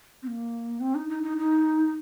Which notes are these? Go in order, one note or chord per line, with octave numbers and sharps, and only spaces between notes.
C4
A#3
C4
D#4
D#4
D#4
D#4